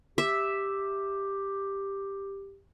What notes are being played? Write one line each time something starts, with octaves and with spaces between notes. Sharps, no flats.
G4 E5